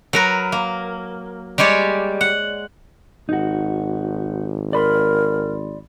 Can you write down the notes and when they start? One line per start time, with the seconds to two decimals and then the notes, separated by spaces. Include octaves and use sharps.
0.13 F#3 A#4 B4
0.52 A#3
1.58 G3 G#3 G4 C#5 D5
2.21 F#5
3.29 G#1 D#4 F#4
4.73 A#4 D5 B5 C6